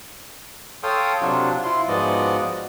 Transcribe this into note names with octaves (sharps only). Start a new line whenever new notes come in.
A4 C#5 F5 G5 C6 D#6
C3 F#3 D4 F4 F#4
E4 F4 C6
G#2 F3 B3 F#4 D5 D#5